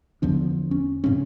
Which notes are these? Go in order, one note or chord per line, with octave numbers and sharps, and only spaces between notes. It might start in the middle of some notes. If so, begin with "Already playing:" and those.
E2 D3 F3 D4
C#4
A2 C#3 C4 C#4